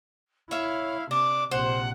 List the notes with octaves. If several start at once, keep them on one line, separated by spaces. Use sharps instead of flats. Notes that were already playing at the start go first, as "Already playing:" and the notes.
E4 C#5 E5 F5
C3 D4 D6
A#1 C3 C5 F#5